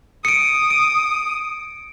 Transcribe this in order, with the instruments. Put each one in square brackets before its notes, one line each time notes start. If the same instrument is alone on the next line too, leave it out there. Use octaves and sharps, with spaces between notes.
[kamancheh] D#6 [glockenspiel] C#7 D7
[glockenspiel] D7